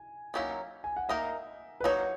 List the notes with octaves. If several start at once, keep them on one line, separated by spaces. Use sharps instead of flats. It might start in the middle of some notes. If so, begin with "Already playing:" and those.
Already playing: G#5
D#3 F#3 A#3 C#4 E4
G#5
F#5
A#3 D#4 A#4 D#5 E5
B4
F#3 A#3 D#4 F#4 C#5